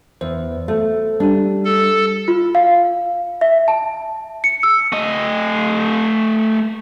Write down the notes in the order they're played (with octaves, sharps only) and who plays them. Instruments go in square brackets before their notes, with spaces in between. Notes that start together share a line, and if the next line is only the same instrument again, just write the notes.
[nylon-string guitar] E2 [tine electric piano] C5
[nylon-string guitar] A3
[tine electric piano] G3 G4 [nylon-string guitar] D4
[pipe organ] A4
[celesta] F4
F5
E5
A5
C#7
E6
[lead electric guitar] A3 D#5